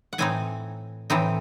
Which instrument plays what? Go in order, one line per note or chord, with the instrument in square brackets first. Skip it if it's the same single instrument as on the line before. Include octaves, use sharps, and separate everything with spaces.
[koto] F#5
A2 E3 C4 D#4 G#5
A2 E3 C4 D#4